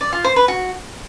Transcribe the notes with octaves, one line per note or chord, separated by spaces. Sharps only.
D5
F4
C5
B4
F#4